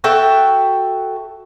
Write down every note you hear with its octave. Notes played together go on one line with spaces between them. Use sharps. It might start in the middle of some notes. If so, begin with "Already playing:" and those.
F#4 A4 E5 G5